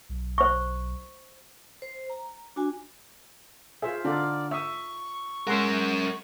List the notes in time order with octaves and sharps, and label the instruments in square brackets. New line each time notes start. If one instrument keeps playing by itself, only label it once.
[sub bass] B1
[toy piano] C5 C#6
[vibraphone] C5
A#5
D4 F#4 G#5
[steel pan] F4 C5 E5 [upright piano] G#4
[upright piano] D3 [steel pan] D#4 F4 A4 [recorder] D5
[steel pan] E5 D#6 [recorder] C#6 [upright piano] E6
[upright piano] G#3 [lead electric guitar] C#4 A#4 [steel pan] F#5 C6 E6